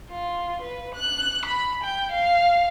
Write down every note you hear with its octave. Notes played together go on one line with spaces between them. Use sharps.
F4
B4
F#6
B5
G5
F5